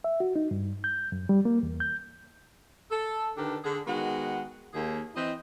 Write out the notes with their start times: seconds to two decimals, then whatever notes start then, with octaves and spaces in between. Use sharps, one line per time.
0.04 E5
0.20 F#4
0.36 D#4
0.51 G2
0.84 G6
1.12 F#2
1.29 G3
1.45 A#3
1.63 E2
1.80 G6
2.90 A4
3.37 D3 D#3 D4 G4 A4 B4
3.64 D3 G#4
3.87 D#3 G#3 B3 F#4 F#5
4.74 D#2 G#4
5.15 E3 C4 E4 D#5